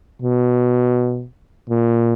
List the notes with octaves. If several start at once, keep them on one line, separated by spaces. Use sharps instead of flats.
B2
A#2